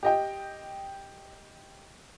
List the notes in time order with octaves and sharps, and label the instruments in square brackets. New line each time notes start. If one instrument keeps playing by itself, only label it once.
[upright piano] G4 D#5 G5